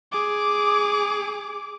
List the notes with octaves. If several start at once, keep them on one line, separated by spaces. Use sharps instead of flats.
G#4 D6